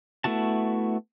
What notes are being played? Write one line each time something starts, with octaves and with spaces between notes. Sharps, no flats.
A3 B3 E4 F#4 A5